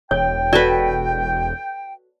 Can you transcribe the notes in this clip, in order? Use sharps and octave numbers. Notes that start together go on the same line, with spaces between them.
E1 C#5 G5
F#4 A4 B4 D5